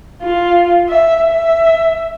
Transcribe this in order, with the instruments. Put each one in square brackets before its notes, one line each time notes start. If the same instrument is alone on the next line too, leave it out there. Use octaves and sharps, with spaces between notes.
[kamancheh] F4
E5
E5